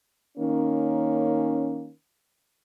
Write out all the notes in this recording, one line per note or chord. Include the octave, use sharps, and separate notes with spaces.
D#3 A#3 C#4